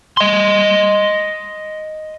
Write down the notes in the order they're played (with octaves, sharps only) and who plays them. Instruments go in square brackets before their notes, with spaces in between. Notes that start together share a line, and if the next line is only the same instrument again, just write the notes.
[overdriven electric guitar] D#5 C6